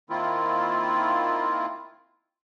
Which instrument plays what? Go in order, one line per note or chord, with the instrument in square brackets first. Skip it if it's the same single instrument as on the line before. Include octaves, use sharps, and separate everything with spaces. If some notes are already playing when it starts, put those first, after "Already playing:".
[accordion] D#3 A#3 C4 E4 F4